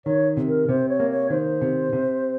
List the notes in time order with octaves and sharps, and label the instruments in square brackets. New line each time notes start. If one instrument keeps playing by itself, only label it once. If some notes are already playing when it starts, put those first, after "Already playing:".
[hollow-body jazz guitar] D#3 [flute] C#5
[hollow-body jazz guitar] C3
[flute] A#4
[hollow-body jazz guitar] C3 [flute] C5
[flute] C#5
[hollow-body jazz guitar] A#3
[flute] C#5
[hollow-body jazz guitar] D#3 [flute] C5
[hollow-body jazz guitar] C3
C3